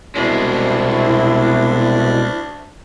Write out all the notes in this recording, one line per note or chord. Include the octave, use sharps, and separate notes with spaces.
C2 B2 G#3 D4 E4